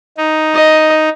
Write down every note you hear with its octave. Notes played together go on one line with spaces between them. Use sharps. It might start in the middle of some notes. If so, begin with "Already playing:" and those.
D#4
D#5